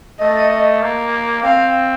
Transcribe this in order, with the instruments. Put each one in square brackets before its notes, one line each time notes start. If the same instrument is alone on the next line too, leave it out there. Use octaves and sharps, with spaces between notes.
[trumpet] A3 [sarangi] D#5
[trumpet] A#3
[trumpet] C4 [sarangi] F5